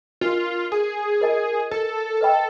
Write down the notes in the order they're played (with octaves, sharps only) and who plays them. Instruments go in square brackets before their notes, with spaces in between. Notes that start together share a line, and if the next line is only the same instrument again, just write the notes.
[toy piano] D4 F#4 A#4 D#5 [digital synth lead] F4
[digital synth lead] G#4
[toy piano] F4 A#4 D#5 G#5
[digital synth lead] A4
[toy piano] B4 D#5 G5 B5